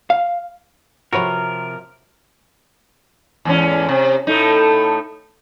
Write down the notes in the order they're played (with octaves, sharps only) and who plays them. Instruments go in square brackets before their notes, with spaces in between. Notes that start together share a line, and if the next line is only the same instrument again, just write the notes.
[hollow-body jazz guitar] F5
[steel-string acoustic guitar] C3 F3 [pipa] F#4 B4 C#5 [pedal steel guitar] A#4
[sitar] E2 G#2 C#4
C3
A2 A3 D#4